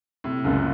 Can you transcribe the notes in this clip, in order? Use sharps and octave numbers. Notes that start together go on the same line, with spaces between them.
A2 C3
C#2 F#2 A#2